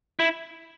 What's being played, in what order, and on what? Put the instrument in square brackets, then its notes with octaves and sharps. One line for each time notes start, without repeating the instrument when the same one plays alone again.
[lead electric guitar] E4